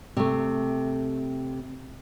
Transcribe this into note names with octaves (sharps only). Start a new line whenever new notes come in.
C3 A3